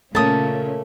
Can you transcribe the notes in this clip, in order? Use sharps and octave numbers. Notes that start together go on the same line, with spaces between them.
A#2 C#3 A3 A#3 C#4 A5 D#6